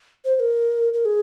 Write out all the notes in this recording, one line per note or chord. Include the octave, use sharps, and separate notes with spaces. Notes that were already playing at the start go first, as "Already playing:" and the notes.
C5
C5
A#4
A#4
G#4